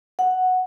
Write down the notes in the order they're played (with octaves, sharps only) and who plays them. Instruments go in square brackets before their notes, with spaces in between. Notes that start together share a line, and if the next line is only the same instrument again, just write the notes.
[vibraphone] F#5